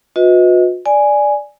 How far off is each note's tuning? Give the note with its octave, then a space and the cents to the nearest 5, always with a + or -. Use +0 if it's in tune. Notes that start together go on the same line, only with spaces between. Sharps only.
F#4 -45 B4 +5 D#5 +30
D5 +0 G#5 +0